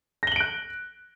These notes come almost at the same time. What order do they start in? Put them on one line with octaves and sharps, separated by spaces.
A#6 G7 F#7 D7 F#6